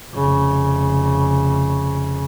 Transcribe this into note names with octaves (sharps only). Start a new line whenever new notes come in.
F1 C#3